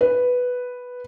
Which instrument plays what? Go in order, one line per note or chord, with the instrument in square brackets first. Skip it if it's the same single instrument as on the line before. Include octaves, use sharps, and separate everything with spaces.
[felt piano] B4